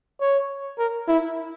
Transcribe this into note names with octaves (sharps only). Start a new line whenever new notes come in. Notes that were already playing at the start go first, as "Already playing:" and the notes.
C#5
A#4
E4